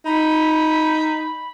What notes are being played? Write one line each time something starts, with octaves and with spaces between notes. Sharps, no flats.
D#4 B5